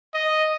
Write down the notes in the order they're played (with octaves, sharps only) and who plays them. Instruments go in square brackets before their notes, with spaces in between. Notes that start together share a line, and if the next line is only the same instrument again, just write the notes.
[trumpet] D#5